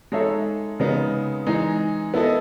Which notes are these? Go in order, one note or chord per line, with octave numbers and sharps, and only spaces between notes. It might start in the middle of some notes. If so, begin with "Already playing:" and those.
G#3 D#4 A4 C#5 E5
C#3 G#3 B3 D#4
E3 G#3 D#4
B3 E4 A4 D#5